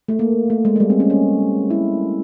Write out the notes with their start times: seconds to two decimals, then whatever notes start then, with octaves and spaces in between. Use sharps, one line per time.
0.08 A3
0.19 A#3
0.50 A3
0.65 G#3
0.76 G#3
0.80 G3
0.90 C4
1.00 C#4
1.10 C#4
1.70 E4